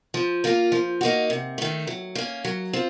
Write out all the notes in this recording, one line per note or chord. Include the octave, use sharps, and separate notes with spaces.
F3
A#3 F4 A#4
F3
A#3 D#4 F#4
C3
D#3 A3
F#3
A#3 C#4
F#3
C4 F4